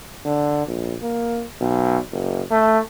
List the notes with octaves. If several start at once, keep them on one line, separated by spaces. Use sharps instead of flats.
D3
A#1
A#3
B1
F#1
A3